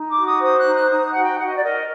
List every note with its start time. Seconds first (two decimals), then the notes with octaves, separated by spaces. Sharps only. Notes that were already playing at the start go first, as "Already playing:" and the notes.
Already playing: D#4
0.09 D6
0.17 F#4
0.25 D#6
0.41 C5 D#6
0.58 F#6
0.65 D#4
0.74 F#6
0.89 D#4 D#6
1.10 F#4 F#5
1.22 G5
1.38 F#4 F#5
1.46 D#5
1.55 D5
1.63 A#4 D#5